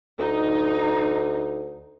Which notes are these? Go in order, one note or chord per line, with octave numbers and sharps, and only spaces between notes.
D2 D#4